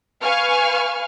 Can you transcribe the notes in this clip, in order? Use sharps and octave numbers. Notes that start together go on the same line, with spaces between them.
B4 F5 G#5 C#6 F6